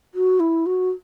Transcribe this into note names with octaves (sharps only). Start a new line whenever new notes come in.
F#4
E4
F#4